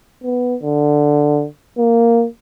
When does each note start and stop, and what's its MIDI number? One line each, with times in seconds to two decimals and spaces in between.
0.24 0.55 59
0.63 1.46 50
1.78 2.25 58